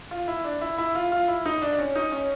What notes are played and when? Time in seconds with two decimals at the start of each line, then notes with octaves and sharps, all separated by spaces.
0.11 F4
0.28 E4
0.44 D4
0.61 E4
0.78 E4
0.95 F4
1.12 F4
1.28 E4
1.46 D#4
1.62 D4
1.73 D4
1.79 C#4
1.95 D#4
2.12 C#4